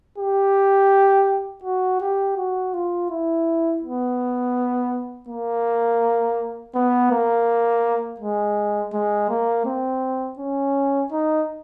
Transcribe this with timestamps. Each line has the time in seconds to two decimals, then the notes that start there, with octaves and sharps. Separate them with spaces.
0.18 G4
1.64 F#4
2.01 G4
2.37 F#4
2.73 F4
3.10 E4
3.82 B3
5.29 A#3
6.75 B3
7.11 A#3
8.20 G#3
8.93 G#3
9.30 A#3
9.66 C4
10.39 C#4
11.12 D#4